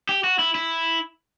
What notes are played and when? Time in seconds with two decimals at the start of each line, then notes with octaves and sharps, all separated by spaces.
0.09 G4
0.24 F#4
0.39 E4
0.55 E4